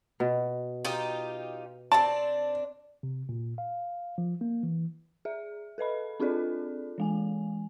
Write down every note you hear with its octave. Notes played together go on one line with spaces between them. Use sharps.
B2
D#4 F4 G4
C4 D4 D5 A5
C3
A#2
F5
F3
A#3
E3
G#4 E5
A4 B4 D#5 B5
C4 D4 F4 G#4 A4 D5
E3 G#3 G#5